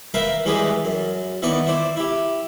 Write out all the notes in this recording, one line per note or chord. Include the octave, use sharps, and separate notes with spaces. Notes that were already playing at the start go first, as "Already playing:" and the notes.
A#4 B4 E5 F5 G5 B5
E3 G3 G#3 G4 G#4 B4
F#2
D#3 E3 B3 D5 C#6
E4 C5 D5
E4 G4